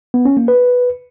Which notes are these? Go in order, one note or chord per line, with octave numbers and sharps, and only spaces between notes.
B3
C#4
A#3
B4